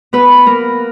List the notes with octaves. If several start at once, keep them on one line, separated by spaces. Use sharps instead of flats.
B3 B4
A#3 A#4